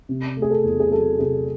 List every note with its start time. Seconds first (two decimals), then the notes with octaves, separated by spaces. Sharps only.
0.09 C3
0.37 A3
0.42 G#4
0.50 A4
0.64 E2
0.80 G#4
0.91 F#3 A4
1.19 C3 G#4